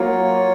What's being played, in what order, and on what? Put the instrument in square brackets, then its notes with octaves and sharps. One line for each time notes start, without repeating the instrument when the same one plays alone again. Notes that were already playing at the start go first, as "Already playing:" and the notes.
Already playing: [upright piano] F#3 A#3 F4 [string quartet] C#5